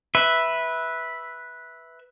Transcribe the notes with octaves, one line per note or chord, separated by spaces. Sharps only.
B4 E5